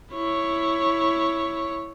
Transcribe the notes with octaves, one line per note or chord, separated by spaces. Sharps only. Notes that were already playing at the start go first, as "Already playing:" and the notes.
E4 C#5